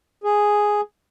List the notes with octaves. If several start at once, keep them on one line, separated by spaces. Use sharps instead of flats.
G#4